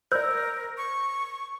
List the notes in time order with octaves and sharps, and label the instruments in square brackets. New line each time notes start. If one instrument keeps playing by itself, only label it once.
[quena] A#4 [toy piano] C5 D5 [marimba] E6 G6
[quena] C#6